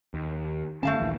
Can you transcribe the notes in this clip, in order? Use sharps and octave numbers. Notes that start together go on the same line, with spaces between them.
D#2
F#1 D3 A3 C#4 F5 A5
A#1 D#2 E3